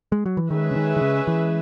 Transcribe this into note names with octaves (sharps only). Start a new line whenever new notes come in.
G#3
F#3
E3
D#3 G#3 C#4 G#4 B4 E5
C#3
D#3
D#3
C#3
E3